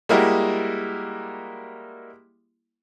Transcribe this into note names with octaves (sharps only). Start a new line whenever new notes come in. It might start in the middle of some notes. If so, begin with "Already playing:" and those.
G3 G#3 A#3 E4 F#4 D#5